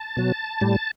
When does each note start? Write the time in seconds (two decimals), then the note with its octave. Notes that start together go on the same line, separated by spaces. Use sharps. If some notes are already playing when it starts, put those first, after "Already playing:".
Already playing: A5
0.17 B2 F#3
0.61 A2 G3